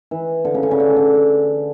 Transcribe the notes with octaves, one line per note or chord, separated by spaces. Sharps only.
E3
D3
C#3
D3
C#3
D3
D3
D3